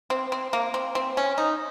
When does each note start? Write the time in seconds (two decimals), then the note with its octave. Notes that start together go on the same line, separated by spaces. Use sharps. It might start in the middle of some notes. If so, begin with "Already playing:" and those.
0.10 C4
0.32 C4
0.53 A#3
0.74 C4
0.95 C4
1.17 C#4
1.38 D#4